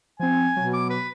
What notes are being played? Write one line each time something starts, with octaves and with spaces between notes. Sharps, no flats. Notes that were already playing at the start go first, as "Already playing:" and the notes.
F3 C4 G#5
B2 F#3
D6
B4